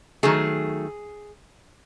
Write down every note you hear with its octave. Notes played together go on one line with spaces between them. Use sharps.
D#3 F#3 A3 G#4